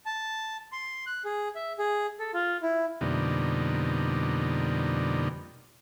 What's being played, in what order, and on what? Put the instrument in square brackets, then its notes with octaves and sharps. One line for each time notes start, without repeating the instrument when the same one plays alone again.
[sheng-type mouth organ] A5
C6
F#6
G#4
E5
G#4
A4
F4
E4
[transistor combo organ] F2 B2 D3 G3 A#3 D#4